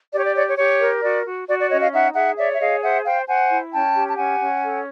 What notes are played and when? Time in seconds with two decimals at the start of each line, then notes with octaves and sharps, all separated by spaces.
0.13 G4 D5
0.19 C#5
0.25 D5
0.35 C#5 D5
0.47 C#5
0.58 G4 C#5
0.80 A#4
1.02 F#4 D5
1.25 F#4
1.48 F#4 D5
1.59 D5
1.70 C#4 C#5 D#5
1.81 D#5 F5
1.92 D#4 E5 F#5
2.15 G#4 E5 F#5
2.37 C#5 D5 E5
2.53 E5
2.60 G#4 D#5 F5
2.82 C5 E5 F#5
3.05 C5 F5 G5
3.27 C5 F#5 G#5
3.49 E4
3.72 C#4 G5 A5
3.95 G4
4.10 A5
4.17 C#4 F#5 G#5
4.40 C#4
4.62 A4